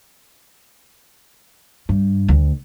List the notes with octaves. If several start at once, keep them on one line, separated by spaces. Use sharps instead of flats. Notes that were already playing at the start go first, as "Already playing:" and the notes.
G2
D2